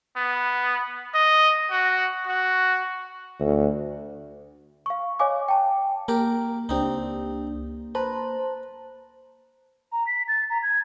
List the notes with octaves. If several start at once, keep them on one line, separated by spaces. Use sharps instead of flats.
B3
D#5
F#4
F#4
D2
F5 C#6
C#5 D#5 F5 G#5 D6
G5 A5
A#3 G4 A#4
C#2 C4 D4 D#4 G4
B4 C5 A5 A#5
A#5
B6
A6
A#5
G#6